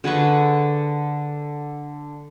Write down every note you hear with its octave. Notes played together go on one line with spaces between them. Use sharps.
D3 G#4 B4 C#6